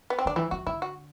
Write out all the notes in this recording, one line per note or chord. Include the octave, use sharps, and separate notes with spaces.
B3
C4
D3 D4
E3 E4
E3 F#4
D3 E4
F#4